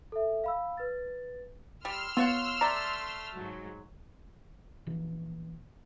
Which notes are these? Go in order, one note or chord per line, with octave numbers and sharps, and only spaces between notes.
A4 E5
F5 B5 E6
B4 A6
G3 C6 E6 F6
B3 F4 C#5 F#5
A3 D5 A#5
G#2 F#3
A#1 E3